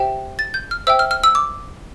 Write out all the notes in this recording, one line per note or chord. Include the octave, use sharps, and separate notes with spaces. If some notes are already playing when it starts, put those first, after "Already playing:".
Already playing: G4 C5 E5 G5
A6
G6
F6
C5 E5 G5 E6
F6
F6
E6
D6